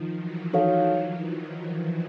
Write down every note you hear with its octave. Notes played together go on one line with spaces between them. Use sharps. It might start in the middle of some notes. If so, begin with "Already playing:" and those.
Already playing: D#3 F3
E3 F#3
D#3 F3 D#4 F#4 A4 C#5 F5
D#3 F3